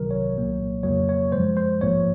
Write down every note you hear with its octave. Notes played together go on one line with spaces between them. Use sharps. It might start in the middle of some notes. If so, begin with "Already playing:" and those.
Already playing: C2 C3 D#3 F#3 A#4
C#5
C2 A#2 F#3 A#3
F2 C#3 F#3 A#3 C#5
C#5
F#2 F3 G#3 C5
C5
A#1 G#2 F3 A#3 C#5